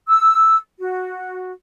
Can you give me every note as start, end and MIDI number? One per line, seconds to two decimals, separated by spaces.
0.07 0.56 88
0.80 1.53 66